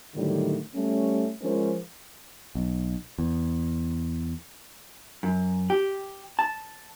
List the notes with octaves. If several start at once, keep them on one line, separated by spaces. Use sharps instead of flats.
A2 D3 D#3 F#3 G3
G3 A3 C#4
F3 G#3 C#4 A#4 C5
B1
E2
F#2
G4
A5